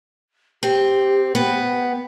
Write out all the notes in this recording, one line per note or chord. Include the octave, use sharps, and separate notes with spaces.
C4 G4
B3 G5